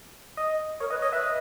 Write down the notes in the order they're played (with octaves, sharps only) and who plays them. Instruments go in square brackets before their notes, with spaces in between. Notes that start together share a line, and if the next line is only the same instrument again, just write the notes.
[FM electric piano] D#5
[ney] A#4 [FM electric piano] C#5
[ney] B4 [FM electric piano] D#5
[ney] C#5 [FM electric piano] D#5
[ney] B4 [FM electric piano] E5
[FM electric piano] D#5